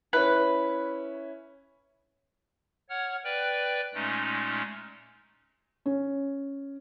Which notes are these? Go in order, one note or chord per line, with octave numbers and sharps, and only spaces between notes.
C#4 E4 B4
C#5 F#5 F6
B4 D5 G5 F#6
A#2 G#3 A3 C#4 D#4
C#4